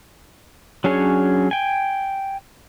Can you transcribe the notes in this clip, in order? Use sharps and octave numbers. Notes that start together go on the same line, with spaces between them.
F#3 C#4 D4 G#4 C#5
G5 G#5